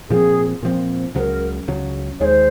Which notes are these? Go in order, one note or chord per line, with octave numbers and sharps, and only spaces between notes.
A#2 F3 C4 G#4
A#2 F3 C4
C#2 C#3 F#3 A#4 C5
C#2 C#3 F#3
D#2 D#3 G#3 C5 C#5